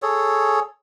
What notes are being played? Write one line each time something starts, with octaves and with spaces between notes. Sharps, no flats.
G#4 A4 C#5